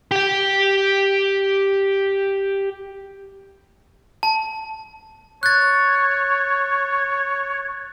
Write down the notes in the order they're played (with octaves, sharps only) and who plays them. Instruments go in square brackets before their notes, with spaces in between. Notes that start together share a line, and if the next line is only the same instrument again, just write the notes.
[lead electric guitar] G4 G5
[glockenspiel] A5
[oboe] C#5 [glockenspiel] F#6 A6